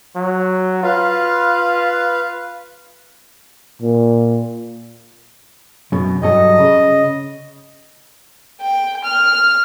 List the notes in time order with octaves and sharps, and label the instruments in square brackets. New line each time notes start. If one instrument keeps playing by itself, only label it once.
[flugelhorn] F#3
[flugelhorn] F4 [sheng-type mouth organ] B4 F5
[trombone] A#2
[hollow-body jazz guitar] F#2 B2
[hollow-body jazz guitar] G2 F#3 A4 [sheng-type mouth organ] D#5
[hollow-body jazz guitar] C#3
[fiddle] G5
F6